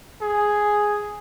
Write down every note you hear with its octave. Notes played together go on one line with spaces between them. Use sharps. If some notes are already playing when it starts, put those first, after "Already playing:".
G#4